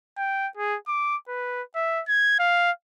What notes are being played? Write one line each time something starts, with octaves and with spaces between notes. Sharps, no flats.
G5
G#4
D6
B4
E5
G#6
F5